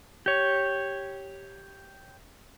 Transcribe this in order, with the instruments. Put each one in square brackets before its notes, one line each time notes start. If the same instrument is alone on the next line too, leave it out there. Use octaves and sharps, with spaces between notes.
[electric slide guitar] G4 C#5